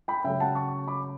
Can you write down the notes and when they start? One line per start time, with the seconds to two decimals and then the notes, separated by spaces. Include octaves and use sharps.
0.08 G5 B5
0.24 C#3 F#3 A3 E5 G5
0.40 F#5 A5
0.55 A5 C#6
0.88 B5 D6